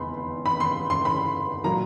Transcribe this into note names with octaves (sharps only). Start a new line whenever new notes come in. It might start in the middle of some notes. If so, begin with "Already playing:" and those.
Already playing: F1 E2 B5 C6
B5
C6
C6
B5
A#2 F#3 A#3 A#5